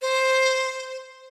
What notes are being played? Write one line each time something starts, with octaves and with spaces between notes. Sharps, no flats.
C5